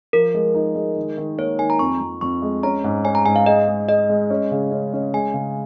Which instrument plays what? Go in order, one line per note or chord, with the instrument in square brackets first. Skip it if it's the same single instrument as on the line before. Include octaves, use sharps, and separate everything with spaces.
[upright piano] F3 [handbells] A#4
[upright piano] G#3
D#4
G#3
D#3
D#3
[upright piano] A#3 [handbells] C#5
[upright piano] D#3 [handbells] G#5
[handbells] A#5
[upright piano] F2 [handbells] C#6
[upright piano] F2
[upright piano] F2 [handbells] C#6
[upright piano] G#3
[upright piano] C#4 [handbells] A#5
[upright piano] G#2
[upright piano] C#4 [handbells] G#5
[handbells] A#5
[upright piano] G#2 [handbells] G#5
[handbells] F5
[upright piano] G#4 [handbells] D#5
[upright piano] G#3
[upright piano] G#4 [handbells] D#5
[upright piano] G#3
C#4
C#3
C#4
C#4
[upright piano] G#3 [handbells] G#5
[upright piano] C#3